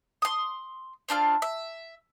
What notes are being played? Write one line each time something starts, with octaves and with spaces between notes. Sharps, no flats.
C6 D#6
C4 D4 F4 F6
E5